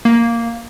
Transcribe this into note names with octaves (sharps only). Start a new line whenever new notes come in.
A#3